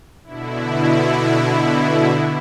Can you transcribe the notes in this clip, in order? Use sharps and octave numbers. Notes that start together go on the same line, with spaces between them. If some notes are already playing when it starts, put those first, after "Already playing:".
B2 D3 E4